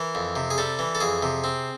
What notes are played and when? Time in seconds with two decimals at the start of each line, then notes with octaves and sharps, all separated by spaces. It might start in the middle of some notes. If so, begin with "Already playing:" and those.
Already playing: E3 A#4
0.15 F2
0.36 C3
0.50 G#4
0.58 G3 A4
0.79 E3
0.95 A4
1.00 F2 G#4
1.23 C3
1.44 C4